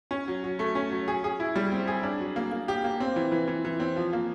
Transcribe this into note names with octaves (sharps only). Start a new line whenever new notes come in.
C#4
F#3
F#3
A3
C#4
F#3
G#4
G#4
E4
G3
C4
G#4
D4
F#3
A#3
A#3
G4
A#3
C4
E3
E3
E3
E3
C4
F3
A#3